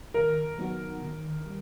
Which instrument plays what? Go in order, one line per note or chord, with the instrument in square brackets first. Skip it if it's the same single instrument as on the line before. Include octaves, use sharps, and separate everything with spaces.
[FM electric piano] D#3 [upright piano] A#4
[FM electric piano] F#3 B3 D#4 F#4
D#3
G3